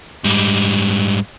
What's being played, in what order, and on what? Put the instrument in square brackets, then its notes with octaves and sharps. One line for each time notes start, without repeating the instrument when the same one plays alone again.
[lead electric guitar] G#2 G3